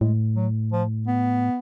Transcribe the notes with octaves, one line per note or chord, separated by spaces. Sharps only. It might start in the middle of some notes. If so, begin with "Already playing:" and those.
A2 G#3
F#3
F3
B3